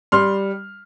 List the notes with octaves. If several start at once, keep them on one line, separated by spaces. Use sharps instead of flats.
G3 C6 F6